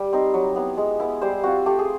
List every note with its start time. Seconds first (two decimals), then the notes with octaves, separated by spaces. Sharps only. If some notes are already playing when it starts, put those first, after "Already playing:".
Already playing: G3
0.13 C4 D#4
0.34 F#3
0.56 B3 E4
0.77 G#3
1.00 B3 E4
1.22 G3 C5
1.43 C4 F4 F#4
1.66 A3 G4
1.79 G#4